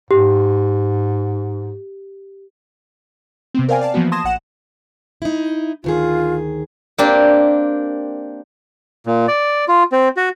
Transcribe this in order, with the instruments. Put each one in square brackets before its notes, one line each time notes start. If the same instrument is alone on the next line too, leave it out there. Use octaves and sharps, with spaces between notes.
[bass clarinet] G#2 [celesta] G4
[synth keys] C3 B3 C4
A#4 C5 D5 F5 G5 G#5
D5 F5 A5
E3 F3 A#3 B3 F#4
A5 C6 D#6 G#6 A#6 E7
A1 F#5 E7
[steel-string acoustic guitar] D#4 E4
[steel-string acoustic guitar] D2 D#3 G#4 [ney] F4
[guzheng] A#3 C4 D4 G4
[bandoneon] A#2
D5
F4
C4
F#4